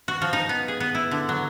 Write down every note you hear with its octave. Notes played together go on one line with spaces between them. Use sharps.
F#4
F3
D#4
B3
G#4
B3
E4
D3
F#3